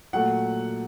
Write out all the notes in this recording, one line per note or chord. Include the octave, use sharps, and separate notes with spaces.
A#2 F#3 A3 F#5